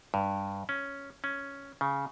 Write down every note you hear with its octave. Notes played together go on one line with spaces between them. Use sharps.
G2
C#4
C#4
C#3